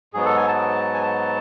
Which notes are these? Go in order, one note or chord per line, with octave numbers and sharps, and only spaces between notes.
G#2 F#3 B3 G#4
A4
G#5
A5
G#5
A5